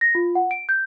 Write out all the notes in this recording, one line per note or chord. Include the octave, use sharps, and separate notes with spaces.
A#6
F4
F#5
D7
G6